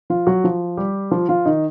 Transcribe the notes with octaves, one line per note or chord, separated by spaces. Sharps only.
F3 F4
F#3 F#4
F3 F4
G3 G4
F3 F4
F3 F4
D#3 D#4